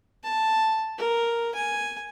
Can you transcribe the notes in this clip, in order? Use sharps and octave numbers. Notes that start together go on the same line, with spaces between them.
A5
A#4
G#5